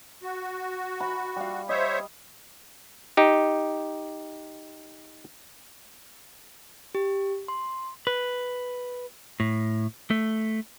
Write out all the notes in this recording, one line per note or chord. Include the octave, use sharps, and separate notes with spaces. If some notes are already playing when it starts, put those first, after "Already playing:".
F#4
B5
G3 F5
C5 C#5 D#5 E5
D#4 G4
G4
C6
B4
A2
A3